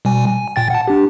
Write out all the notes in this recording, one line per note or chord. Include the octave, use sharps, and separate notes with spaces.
B2 G3 G#5
G#5
A#2 G5 A6
F#5 A5
D4 G4